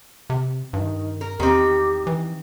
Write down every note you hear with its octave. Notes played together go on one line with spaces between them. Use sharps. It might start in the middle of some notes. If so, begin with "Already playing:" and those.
C3
G2 D#3
A#4
E2 D#3 C4 G4
E3